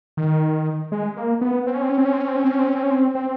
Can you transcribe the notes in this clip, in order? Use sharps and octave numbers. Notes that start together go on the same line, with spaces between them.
D#3
G#3
A#3
B3
C4
C#4
C4
C#4
C4
C#4
C4
C#4
C4
C#4
C4
C#4
C4
C#4
C4
C#4
C4
C4